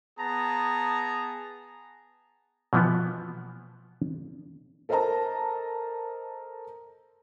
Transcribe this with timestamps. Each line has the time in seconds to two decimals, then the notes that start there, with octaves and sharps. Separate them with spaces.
0.19 B3 G#4 A5 A#5
2.73 B2 E3 F3 A#3 B3
4.89 A4 A#4 C5 D#5 A5 A#5